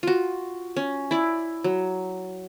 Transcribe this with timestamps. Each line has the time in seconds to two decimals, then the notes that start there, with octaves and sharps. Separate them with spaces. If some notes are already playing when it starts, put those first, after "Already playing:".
0.03 F4 F#4
0.77 C#4
1.11 E4 D5
1.64 F#3